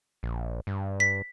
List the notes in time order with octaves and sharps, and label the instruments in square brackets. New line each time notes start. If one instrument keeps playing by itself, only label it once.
[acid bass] A#1
G2
[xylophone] B6